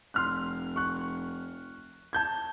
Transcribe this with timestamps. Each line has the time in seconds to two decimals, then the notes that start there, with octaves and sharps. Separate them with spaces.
0.14 F1 C6 F6 F#6
0.76 C#6 F#6
2.13 A5 G6 G#6